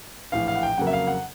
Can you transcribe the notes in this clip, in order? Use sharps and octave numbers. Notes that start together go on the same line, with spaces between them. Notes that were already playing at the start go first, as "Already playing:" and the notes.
A#1 A2 E3 F5
F5
F#5
G5
F2 C#3 F#3 A#3 F#5
E5
F5
F#5